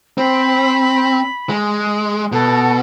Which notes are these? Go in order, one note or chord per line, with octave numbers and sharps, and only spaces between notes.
C4 B5
G#3
B2 A4